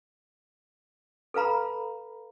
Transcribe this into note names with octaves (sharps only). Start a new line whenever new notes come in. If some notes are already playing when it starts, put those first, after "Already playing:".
A4 B4 F5 A#5 B5